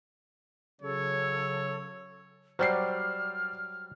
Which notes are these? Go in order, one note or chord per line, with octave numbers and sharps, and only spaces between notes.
C#3 F#3 A4 C#5
F#3 G3 C5 D5 F6 C7